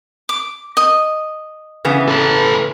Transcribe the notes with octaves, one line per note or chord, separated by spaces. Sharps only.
D6
D#5
C#3 E3 B3
A4 B4